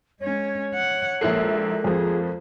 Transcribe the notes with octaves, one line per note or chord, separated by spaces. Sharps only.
G#3 C#4 C#5
F#5
A#1 G#3 A#3 E4 A4 A#4 F#6 C7
F2 F3 G#4